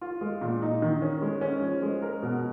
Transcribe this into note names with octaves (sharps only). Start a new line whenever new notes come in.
F4
G#3
A#2
D#4
D#3
C#4
G#3
C#4
F3
G#3
A#4
B2